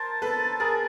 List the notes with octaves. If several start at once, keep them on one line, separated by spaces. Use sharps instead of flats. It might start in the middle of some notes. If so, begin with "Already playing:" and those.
Already playing: A#4 C5 A5
A4 B4
G#4 A#4